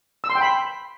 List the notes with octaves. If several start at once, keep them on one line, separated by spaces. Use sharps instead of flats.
E6
C6
G5
B5